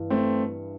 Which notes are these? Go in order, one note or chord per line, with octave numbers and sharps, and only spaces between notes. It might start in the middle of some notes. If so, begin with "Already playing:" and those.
Already playing: G2 E3
A3 C4